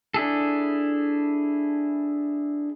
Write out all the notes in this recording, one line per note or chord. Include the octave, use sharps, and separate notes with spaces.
D4 E4 G#4 A4